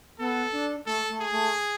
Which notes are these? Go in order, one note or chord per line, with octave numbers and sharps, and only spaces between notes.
B3 A4
D4
A3 A4
A3
G#4
A3